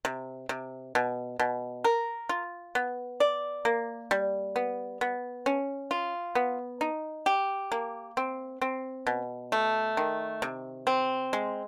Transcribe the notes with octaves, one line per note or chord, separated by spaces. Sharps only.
C3
C3
B2
B2
A#4
F4
B3
D5
A#3
G3
B3
B3
C#4
F4
B3
D#4
G4
A#3
C4
C4
B2
A3
D#3
C3
C4
G#3